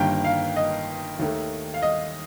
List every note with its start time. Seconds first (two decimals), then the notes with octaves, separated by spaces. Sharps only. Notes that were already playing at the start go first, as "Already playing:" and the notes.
Already playing: G1 G2 D#3 A#3 G5
0.24 F5
0.56 D#5
1.19 D#2 D#3 A3
1.74 F5
1.82 D#5